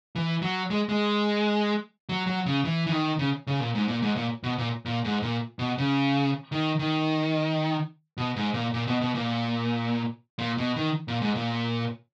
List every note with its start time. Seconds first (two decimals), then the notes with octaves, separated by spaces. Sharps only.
0.16 E3
0.42 F#3
0.70 G#3
0.89 G#3
2.09 F#3
2.27 F#3
2.46 C#3
2.65 E3
2.87 E3
2.92 D#3
3.19 C#3
3.47 C#3
3.60 A#2
3.75 G#2
3.88 A#2
4.02 G#2
4.16 A#2
4.43 B2
4.58 A#2
4.85 A#2
5.05 G#2
5.23 A#2
5.59 B2
5.78 C#3
6.52 D#3
6.79 D#3
8.17 B2
8.36 G#2
8.54 A#2
8.74 A#2
8.87 B2
9.01 B2
9.15 A#2
10.39 A#2
10.58 B2
10.76 D#3
11.08 A#2
11.22 G#2
11.35 A#2